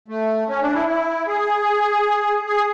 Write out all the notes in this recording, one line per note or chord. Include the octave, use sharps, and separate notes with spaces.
A3
C#4
D4
E4
E4
G#4
G#4